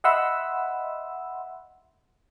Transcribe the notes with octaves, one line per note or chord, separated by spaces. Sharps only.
D#5 E5 F#5 B5 C6 E6